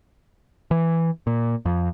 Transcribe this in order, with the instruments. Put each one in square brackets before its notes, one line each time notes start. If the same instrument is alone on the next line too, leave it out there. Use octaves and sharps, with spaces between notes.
[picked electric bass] E3
A#2
F2